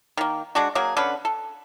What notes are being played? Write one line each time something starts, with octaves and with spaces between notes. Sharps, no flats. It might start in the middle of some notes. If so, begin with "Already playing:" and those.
D#3 A#3
G#3 D4 F#4
F#3 A#3 G#4
D3 C#4 A4 B4
A4